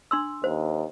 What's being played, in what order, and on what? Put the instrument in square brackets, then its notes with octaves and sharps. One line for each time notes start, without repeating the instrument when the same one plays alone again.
[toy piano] D4 C6 E6
[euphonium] D#2 [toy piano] C5